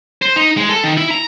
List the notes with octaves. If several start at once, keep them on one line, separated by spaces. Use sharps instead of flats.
C5
D#4
G#3
A4
D#3
E4
A#5